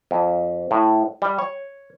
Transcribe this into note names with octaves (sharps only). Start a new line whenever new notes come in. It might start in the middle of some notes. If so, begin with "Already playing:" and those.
F2
A2
G3
C#5